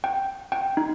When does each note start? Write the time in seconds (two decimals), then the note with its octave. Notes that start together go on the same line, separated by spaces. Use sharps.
0.04 G5
0.52 G5
0.77 D#4